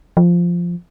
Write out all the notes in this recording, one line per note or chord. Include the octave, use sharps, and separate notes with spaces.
F3